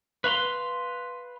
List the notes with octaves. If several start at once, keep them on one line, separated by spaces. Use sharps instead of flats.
B4 F5 B5 C6